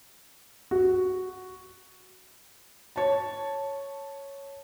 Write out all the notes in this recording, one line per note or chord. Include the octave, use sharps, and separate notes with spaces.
F#4
C#5 A5